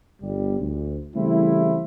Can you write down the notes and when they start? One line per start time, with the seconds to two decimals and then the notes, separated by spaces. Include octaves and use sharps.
0.22 G1 G3
0.61 D2
1.15 C#3 E3 G3 A3 C4 E4